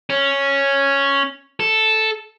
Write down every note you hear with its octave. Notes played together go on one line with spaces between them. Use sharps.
C#4
A4